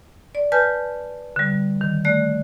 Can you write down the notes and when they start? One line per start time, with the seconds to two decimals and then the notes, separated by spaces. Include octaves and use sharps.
0.35 D5
0.52 B4 G#5 A5 F6 G6
1.36 D3 G3
1.81 D#3
2.05 A3 D5 F#6